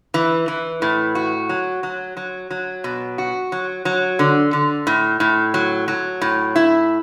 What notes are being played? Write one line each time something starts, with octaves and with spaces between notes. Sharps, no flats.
E3
E3
A2
F#4
F#3
F#3
F#3
F#3
B2
F#4
F#3
F#3
D3
D3
A2
A2
F#3
F#3
A2
E4